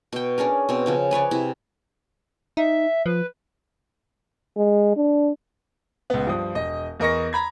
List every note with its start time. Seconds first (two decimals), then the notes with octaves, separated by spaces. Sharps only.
0.13 B2 G5
0.38 C#4 D4 G#4 A#4
0.69 B2 C4
0.86 C#3 F3 C#4
1.11 G#4 B4 C#5 D5
1.31 C3 E4
2.57 D#4 E5
3.06 F3 B4
4.57 G#3
4.96 D4
6.10 C#2 B3
6.27 G2 F3 D#6
6.55 E1 D#5
7.00 E2 A#4 D#5 C#6 A#6
7.33 A#5 B5 G#6